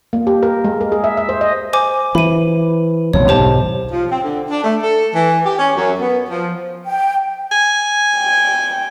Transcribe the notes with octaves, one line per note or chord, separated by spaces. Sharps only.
A#3
G4
A#4
G#3
A#4
G#4
E5
E5
C5
D#5
C5 G#5 D6
E3 B5 D#7
F1 B1 A#2 C#5
B1 G#2 D#3 G4 C5 A5
F3
C4
D3
D4
A3
A4
E3
G4
C#4
F#2
B3
F3
G5
G#5
G5